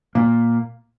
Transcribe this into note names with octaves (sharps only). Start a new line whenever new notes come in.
A#2 A#3